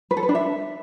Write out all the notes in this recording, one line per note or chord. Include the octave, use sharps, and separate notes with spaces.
B4
A4
B4
D4
E5